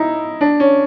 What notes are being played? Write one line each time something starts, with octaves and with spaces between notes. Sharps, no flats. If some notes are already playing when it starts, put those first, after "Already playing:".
Already playing: D#4 E4
D4
C#4